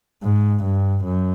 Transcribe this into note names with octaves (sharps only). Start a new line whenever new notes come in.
G#2
G2
F#2